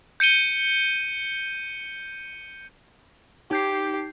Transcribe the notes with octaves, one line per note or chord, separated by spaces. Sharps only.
G6 C#7 D#7 G7
D#4 G4 G6 C7